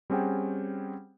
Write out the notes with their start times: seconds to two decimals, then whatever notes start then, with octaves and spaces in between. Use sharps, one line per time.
0.10 G3 C4 C#4 G#4 F#5 G5